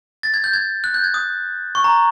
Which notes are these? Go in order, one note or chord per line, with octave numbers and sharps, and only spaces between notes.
A6
G#6
G6
G#6
F#6
G6
G#6
D#6
C#6
A#5